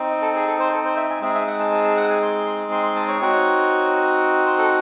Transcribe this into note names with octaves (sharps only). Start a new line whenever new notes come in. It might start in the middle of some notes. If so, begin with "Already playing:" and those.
Already playing: C4 D#4
A4
G#4
A4
C5
A4
C5
E5
G#5
G#3 C4 D#4 G#4 E5
E5
F#5
A5
A5
A5
F#5
G#5
C6
C6
C6
A5
C#5
C4 D#4 F#4
C5
A4